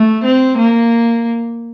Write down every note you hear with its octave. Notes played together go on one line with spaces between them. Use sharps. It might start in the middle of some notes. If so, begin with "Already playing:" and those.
Already playing: A3
C4
A#3